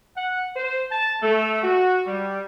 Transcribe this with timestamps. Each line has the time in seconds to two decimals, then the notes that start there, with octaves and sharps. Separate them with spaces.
0.16 F#5
0.56 C5
0.91 A5
1.22 A3
1.63 F#4
2.06 G3